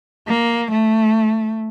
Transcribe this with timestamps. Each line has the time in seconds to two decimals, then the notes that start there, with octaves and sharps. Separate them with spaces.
0.28 A#3
0.72 A3